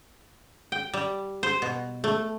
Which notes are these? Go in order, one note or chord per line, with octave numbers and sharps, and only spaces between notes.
G5
G3
C5
B2
A3